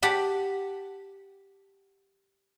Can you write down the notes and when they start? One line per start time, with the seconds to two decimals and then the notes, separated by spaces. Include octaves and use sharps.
0.02 G4 F#5 A5 B5